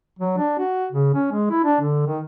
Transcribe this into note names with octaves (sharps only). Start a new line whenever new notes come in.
F#3
D4
F#4
C#3
C#4
G#3
E4
D4
D3
D#3